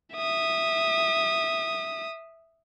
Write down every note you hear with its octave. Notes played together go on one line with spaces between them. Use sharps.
E5 D#6